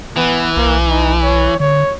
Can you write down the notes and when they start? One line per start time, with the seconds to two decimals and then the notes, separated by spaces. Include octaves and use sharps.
0.16 E3 B3
0.56 B1 A#3
0.89 D#4
1.23 C#5
1.60 D3 C#5